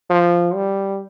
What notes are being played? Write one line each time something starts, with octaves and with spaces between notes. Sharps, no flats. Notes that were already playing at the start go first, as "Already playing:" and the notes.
F3
G3